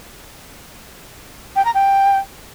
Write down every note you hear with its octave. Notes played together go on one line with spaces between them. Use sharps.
G5
A#5
G5